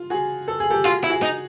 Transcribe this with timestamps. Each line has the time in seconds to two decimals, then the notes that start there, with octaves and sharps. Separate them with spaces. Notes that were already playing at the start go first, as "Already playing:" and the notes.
Already playing: F4
0.10 F#4 G#4
0.48 A4
0.60 G#4
0.70 G4 A4
0.85 F4 F#4 G#4
1.04 E4
1.10 F#4 G#4
1.23 D#4